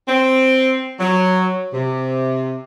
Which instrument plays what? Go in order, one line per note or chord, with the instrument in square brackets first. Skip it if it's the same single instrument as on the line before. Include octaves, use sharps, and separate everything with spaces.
[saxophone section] C4
F#3
C3